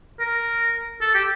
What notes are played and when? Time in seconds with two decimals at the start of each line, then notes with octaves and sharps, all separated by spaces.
0.20 A#4
1.01 A4
1.15 G4